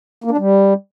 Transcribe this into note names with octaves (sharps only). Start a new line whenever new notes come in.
A#3
D4
G3